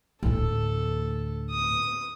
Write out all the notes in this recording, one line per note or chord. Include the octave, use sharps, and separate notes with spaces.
D2 A2 A4
D#6